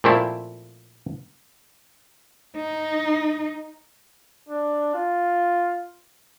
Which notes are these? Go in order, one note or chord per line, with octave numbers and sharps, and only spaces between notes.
A#2 F3 A3 C4 E4
D#4
D4
F4